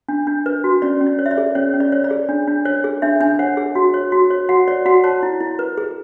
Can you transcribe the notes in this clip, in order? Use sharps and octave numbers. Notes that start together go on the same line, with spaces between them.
D4
D4
B4
F#4
C#4 D5
C#4
D5
C#5
E5
D5
G#4
C#4 C#5
C#4
D5
C#5
D5
G#4
D4
D4
C#5
G#4
D4 E5
D4 G#5
C#5 F#5
G#4
F#4
C#5
F#4
C#5
F#4 F#5
C#5 D5
F#4 F#5
C#5 A5
E4
E4
B4
G#4